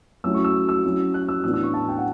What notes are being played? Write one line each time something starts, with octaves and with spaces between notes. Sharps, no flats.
F#3 A3 C#4 E4 E6
C#6
E6
E6
F#3 C#4 E4
F#6
E6
A2 E3 B3 D4 E6
E6
C#6
A5
G5
F#5